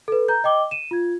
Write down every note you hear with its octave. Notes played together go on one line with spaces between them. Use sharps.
A4 B4
A#5 G6
D#5 G5 D6 G7
D#7 E7
F4 G#6